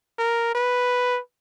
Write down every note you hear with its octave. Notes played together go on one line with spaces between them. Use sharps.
A#4
B4